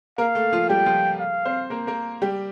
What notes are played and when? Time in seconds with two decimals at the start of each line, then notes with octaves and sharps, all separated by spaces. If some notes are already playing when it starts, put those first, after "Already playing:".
0.18 A#3 A#4 F5
0.35 A3 A4
0.52 F3 F4
0.69 G3 G4 G5
0.86 F3 F4
1.20 F5
1.45 C4 C5
1.70 A#3 A#4
1.87 A#3 A#4
2.22 G3 G4